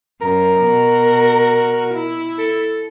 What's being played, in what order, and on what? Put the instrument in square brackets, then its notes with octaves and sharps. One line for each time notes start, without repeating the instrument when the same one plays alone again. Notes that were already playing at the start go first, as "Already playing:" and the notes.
[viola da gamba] F#2 [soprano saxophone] A#4
[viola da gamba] B2 F#4
E4
[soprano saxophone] A4